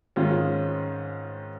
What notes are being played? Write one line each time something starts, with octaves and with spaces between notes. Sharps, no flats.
G#2 D#3 G#3 C#4 F4